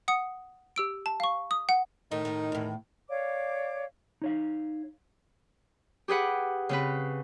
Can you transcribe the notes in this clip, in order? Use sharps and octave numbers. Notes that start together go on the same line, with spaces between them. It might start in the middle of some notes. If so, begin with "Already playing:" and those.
F#5 D#6 C#7
G4 E6 D7
A5
F5 C#6
D#6
F#5
A2 D#3 D#4
A2
E2 A2
C#5 D5 F5 D6
D#4 C#5 F5
G4 G#4 B4 F#5
C#3 C4 B4